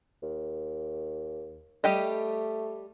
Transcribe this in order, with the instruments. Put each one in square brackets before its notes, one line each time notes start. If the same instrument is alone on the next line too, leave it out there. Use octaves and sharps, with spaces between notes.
[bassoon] D#2
[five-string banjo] G3 G4 D#5 [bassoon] A3